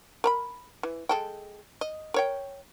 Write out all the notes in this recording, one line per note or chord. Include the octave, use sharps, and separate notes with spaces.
A#4 A#5 B5
E3
G#3 A4 G5
D#5
A#4 C#5 G5